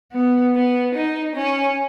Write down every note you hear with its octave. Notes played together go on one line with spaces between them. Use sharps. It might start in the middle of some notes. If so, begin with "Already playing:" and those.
B3
B3
D#4
C#4